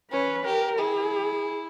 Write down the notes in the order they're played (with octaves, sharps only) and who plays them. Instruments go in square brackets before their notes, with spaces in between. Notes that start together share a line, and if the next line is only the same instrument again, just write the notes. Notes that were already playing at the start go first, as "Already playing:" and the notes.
[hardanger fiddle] C#4 [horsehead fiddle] B4
[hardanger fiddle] G4 [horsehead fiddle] A#4
[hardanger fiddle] E4 [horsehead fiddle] G#4